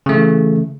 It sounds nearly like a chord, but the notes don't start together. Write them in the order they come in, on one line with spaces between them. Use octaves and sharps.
C#3 A3 E3